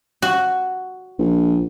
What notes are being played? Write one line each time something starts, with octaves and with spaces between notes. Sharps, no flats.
F#4
A#1